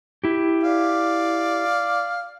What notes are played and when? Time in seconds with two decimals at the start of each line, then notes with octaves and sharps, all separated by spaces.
0.24 E4 G4
0.63 D5 F5